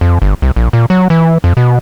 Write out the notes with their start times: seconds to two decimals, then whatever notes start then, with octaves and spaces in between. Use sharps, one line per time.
0.01 F2
0.22 G1
0.42 C2
0.56 A#1
0.73 A#2
0.90 F#3
1.10 E3
1.44 F2
1.57 B2